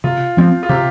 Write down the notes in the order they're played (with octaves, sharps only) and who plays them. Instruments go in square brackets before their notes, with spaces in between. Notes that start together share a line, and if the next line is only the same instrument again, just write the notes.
[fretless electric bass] C3 [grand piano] F4
[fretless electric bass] F3 C4
[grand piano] F4
[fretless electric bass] C3 [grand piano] G4